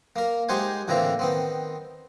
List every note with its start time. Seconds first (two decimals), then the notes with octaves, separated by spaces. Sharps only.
0.16 A#3 A#4
0.49 G#3 D#4 G4 C5 F#5 G#5
0.88 A2 D3 E3 A#3 C4 A#5
1.19 D#3 B3 C4